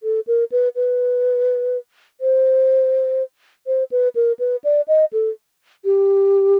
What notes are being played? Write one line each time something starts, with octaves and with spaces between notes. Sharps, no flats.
A4
A#4
B4
B4
C5
C5
B4
A#4
B4
D5
D#5
A4
G4